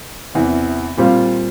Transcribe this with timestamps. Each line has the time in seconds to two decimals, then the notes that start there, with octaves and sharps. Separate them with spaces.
0.35 E2 C3 E3
0.97 A#2 G3 C4 F4